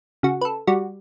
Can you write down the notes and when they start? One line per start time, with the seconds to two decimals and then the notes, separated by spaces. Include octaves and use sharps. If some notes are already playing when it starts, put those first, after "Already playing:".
0.23 C#3 F#4
0.41 B4
0.45 A4
0.67 G3 F#4